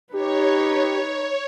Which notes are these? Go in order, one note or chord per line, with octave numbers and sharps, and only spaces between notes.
D#4 G4 B4 C#5